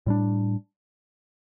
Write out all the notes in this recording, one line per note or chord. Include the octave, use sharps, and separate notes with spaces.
A2 G3 D4